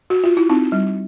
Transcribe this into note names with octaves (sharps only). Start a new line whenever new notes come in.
F#4
F4
E4
C4 D#4
G3